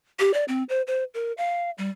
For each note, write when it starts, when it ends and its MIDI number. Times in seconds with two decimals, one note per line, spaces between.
0.19 0.33 67
0.34 0.44 74
0.48 0.63 60
0.69 0.82 72
0.87 1.04 72
1.14 1.32 70
1.38 1.71 77
1.78 1.89 55